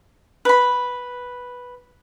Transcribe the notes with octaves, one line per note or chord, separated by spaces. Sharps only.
B4 B5